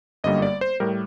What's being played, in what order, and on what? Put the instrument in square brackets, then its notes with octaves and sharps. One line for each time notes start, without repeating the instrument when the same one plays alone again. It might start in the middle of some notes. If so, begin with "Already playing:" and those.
[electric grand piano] G1 F#2 D3 G3 A#3 D#5
D5
C5
A2 G3 A#4